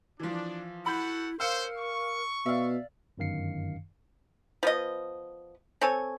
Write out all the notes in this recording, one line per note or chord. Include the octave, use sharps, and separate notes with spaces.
E3 F3 D4
E4 F#4 A4 F#5 B5 G6
C#4 A#4 C5 F5 E6 C#7
C#6
B2 D5 E5 F5
G1 F#2 D#3 F5 C7 C#7
F3 B3 D#5
C4 A4 C#5 G#5